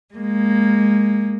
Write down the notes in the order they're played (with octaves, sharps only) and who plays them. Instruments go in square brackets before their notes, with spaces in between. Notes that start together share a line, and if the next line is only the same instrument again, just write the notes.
[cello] G#3 A#3